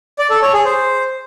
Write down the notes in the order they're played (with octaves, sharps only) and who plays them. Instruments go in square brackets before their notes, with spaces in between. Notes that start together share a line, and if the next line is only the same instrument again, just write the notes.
[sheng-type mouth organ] D5
A4
C#5
G#4
C5